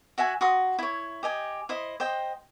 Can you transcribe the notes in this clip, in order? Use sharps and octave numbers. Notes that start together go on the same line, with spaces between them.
F#4 E5 F#5 G#5
F#4 C6 D#6
E4 C#5
G4 D#5 G#5
E4 C5 D#5
C5 D#5 G5